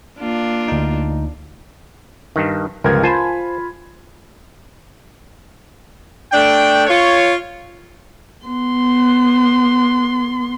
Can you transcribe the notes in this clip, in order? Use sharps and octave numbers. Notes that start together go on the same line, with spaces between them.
A#3 D4 F4
D2 D#4
G2 D#3
G1 C#2 F3 A#4 G#6
F4 C5 G#5 A5 B5
A3 D4 G5
F4 C#5
B3 C6